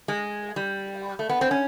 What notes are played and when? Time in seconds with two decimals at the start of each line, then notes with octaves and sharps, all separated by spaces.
0.08 G#3
0.56 G3
1.19 A3
1.29 B3
1.41 C4
1.51 C#4